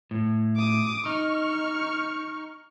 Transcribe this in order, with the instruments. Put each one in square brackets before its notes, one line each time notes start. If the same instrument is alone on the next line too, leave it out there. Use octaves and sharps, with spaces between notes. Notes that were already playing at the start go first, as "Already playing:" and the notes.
[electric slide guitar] A2
[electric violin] D6 D#6
[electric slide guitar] D#4 [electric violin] C#6 F6